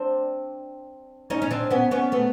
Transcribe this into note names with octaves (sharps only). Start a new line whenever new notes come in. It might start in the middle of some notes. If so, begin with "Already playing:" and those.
Already playing: C4 D4
C#4 D#4
C#4
C4 D4
B3 C#4
B3 C#4
A3 B3